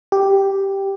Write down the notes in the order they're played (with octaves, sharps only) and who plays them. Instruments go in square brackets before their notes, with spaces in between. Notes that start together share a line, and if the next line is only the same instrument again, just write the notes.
[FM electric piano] G4